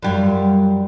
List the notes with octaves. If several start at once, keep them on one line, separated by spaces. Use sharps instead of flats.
F#2 G3 F4